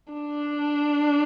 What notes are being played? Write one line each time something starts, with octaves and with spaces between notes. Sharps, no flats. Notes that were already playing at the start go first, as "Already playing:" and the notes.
D4